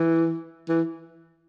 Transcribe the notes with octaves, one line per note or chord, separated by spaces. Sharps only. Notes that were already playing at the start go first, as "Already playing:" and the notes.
Already playing: E3
E3